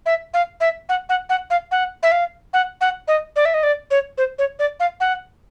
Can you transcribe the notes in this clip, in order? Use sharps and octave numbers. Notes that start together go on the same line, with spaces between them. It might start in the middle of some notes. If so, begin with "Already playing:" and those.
E5
F5
E5
F#5
F#5
F#5
F5
F#5
E5
F5
F#5
F#5
D#5
D5
E5
D#5
D5
C#5
C5
C#5
D5
F5
F#5